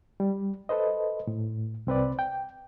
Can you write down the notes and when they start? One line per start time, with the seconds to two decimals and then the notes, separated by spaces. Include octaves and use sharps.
0.20 G3
0.69 A4 B4 C5 D#5
1.27 A2
1.87 C2 C4 B4 D5
2.19 G5